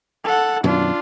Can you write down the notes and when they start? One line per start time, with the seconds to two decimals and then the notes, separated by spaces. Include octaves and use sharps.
0.24 A4 F#5
0.64 F#2 B2 D#3 D4 F4